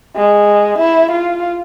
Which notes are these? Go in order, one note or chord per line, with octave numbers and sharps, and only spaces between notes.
G#3
E4
F4